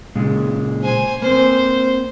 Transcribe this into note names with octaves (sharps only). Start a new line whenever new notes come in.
A#2 C#3 G#3
C5 G#5
A#3 C4 C5